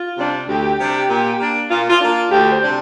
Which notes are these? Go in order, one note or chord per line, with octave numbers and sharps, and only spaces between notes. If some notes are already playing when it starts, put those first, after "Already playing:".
Already playing: F4
C3 G3 D4
D2 G4
C3 G3 D4
A#2
A#3 D4
A#2 F4
F4
A#3 D4 F4
D2 G4
C5
C3 G3 D4